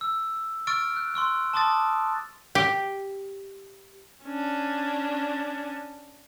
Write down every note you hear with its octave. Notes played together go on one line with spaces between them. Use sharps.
E6
C#6 E6 F6 A6 D7
F#6
C6 C#6 E6 F#6
A5 C6 D6 D#6 A6
G4
C#4 D4